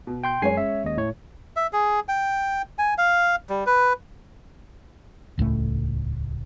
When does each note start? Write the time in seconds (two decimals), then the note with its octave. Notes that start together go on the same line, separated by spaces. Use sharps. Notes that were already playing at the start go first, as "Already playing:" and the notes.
0.07 B2
0.24 G5 C6 G6
0.42 F#2 G#3 C#4 C#5 G#5 C7
0.57 E5
0.84 D#2 D#5
0.97 A2 C#5
1.56 E5
1.73 G#4
2.09 G5
2.78 G#5
2.98 F5
3.50 G3
3.66 B4
5.38 D#1 C#2 A2 A3